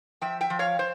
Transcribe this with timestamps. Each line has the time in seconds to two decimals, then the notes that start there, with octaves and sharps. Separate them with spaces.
0.21 F3 E5 G5
0.41 E5 G5
0.50 F3
0.59 C#5 F5
0.79 C5